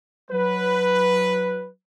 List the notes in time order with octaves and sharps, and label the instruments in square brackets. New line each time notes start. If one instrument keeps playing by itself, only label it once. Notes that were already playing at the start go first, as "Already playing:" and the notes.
[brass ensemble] F#3 B4